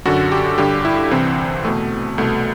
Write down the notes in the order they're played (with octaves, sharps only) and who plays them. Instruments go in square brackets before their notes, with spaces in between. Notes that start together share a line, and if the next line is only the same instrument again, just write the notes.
[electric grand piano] F#2 D3 F#4
G4
G2 D3 G4
E4
C2 C3 E3 C4
E2 B2 A3
C2 B2 A3